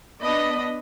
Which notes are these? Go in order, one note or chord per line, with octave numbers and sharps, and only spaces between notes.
B3 D4 D#5 B5